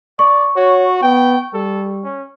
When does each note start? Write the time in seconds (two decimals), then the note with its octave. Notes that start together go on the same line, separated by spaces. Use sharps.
0.19 D5 C#6
0.56 F#4 C#5
1.02 B3 G5
1.54 G3 A4
2.04 C#4